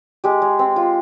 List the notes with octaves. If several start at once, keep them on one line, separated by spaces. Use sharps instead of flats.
G#3 G4
G#3
C4
F4